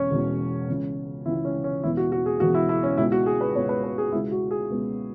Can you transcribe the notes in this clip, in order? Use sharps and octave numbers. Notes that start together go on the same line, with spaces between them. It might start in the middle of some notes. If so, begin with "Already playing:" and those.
Already playing: E1 E2 C#4 C#5
E1 E2 B2
C#2 C#3 E3
C#2 C#3 E3 E4
C#4
C#4
E1 E2 E3 B3 E4
F#4
F#4
G#4
E1 E2 E3 B3 F#4
E4
E4
C#4
C#2 B2 G#3 E4
F#4
G#4
B4
C#2 B2 G#3 C#5
B4
B4
G#4
C#2 B2 G#3 B3 E4
F#4
G#4
C#2 B2 G#3 B3